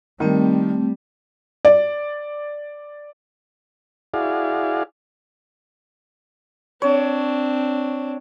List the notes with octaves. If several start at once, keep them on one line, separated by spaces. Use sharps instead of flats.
D#3 G3 A3 C4
D5
E4 F#4 G#4 D5 F5
C4 D4 C#5